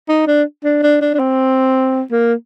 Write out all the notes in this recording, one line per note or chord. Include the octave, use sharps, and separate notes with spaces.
D#4
D4
D4
D4
D4
D4
C4
A#3